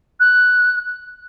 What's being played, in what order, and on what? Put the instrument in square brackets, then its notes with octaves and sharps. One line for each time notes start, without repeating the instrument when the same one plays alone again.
[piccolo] F#6